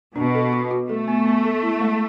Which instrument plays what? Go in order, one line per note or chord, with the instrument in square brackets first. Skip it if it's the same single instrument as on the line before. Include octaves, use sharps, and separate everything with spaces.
[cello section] B2 [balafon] D4
[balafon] A4
F#4
F#4
[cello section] A3 [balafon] A4
[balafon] B3
B3
A4
E4
G#3